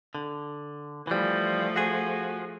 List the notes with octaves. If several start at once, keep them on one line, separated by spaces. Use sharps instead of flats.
D3
E3 F3 G3 A3
F#4 G#4